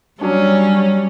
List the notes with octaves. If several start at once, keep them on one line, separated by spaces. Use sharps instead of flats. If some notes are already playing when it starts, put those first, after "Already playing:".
F#3 G3 C#4 D4